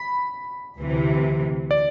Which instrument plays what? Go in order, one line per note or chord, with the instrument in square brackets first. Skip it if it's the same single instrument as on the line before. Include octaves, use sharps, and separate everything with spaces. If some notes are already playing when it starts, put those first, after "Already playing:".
Already playing: [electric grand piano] B5
[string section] D2 C3 E3
[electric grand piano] D5